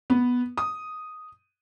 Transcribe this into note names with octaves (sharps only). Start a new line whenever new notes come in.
B3
D#6